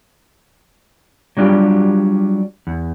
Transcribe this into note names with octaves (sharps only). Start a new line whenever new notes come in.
F#3 G3 D4 F4 G4
E2